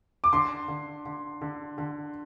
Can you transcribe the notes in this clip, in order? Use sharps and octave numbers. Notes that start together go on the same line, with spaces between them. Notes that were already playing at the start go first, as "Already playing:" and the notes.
D6
D3 C6
D3
D3
D3
D3